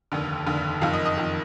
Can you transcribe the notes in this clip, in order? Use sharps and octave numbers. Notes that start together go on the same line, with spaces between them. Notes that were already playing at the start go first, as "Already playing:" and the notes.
F1 D#2 D3
F1 D#2 D3
F#1 F2 D#3 F5
D#5
D#5
F2 D#3